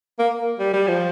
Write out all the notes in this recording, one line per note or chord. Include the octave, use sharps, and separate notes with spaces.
A#3
G3
G3
F3